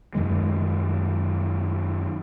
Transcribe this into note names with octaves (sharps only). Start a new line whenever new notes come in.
F#2 D#3 G#3